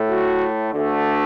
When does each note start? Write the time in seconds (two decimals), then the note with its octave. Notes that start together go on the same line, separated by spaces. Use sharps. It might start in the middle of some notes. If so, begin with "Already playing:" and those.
Already playing: A2 A3
0.09 F#4
0.73 D2 D3 A3